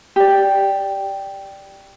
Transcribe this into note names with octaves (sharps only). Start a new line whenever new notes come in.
G4 D5